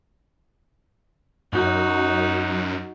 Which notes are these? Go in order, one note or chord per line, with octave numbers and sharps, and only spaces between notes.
F#2 D#4 F#4